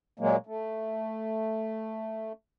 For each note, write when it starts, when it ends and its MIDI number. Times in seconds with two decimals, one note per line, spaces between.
0.20 0.37 46
0.20 0.37 54
0.20 0.37 56
0.20 0.37 58
0.46 2.33 57